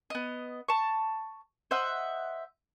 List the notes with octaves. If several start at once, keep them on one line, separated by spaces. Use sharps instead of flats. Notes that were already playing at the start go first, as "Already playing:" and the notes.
B3 D#5
A5 C#6
C5 D#5 E5 F#5